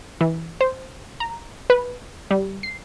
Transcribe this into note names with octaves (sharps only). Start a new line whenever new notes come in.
E3
C5
A#5
B4
G3
C7